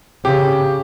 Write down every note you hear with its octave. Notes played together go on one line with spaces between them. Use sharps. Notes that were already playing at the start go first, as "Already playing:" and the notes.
C#3 G4